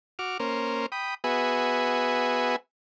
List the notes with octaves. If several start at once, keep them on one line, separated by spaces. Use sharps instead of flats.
F#4 D6 F6
A#3 C#4 A#4 C5
G5 B5 D#6
B3 F#4 G#4 B4 E5 G#5